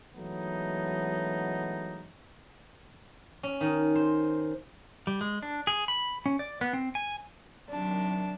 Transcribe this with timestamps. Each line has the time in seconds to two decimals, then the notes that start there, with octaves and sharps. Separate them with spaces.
0.15 E3 F#3 G#3 A3 B3 D#4
3.43 C#4
3.61 D#3
3.95 C5
5.07 G3
5.21 G#3
5.43 D4
5.67 G#4
5.88 B5
6.26 C#4
6.39 D5
6.61 B3
6.73 C4
6.95 G#5
7.69 C3 D#3 F#3 D4